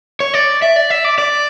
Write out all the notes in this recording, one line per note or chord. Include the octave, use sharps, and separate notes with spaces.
C#5
D5
E5
D5
E5
D5
D5